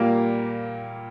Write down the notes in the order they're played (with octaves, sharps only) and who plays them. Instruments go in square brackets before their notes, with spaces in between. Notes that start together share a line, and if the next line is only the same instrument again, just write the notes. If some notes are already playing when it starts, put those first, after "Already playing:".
Already playing: [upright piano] A#2 G3 A#3 F5